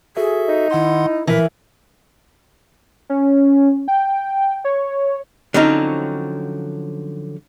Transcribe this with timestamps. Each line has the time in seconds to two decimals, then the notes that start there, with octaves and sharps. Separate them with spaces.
0.17 F#4 G#4 A4 E5
0.48 D#4
0.71 D#3 E4 F#5 C6
1.27 A#2 E3 F3 A#4 B6
3.09 C#4
3.88 G5
4.65 C#5
5.54 D3 F3 F#3 C4 C#4 D#4